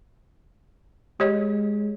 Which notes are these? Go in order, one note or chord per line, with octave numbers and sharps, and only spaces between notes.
G#3 G4 C#5 D#5